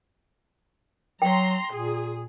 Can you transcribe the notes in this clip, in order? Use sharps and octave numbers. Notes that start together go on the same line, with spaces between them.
F#3 G5 A#5 C6
A#2 G#4